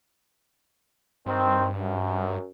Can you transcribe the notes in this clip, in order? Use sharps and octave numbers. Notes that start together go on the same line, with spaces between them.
G2 D#3 C4
F#2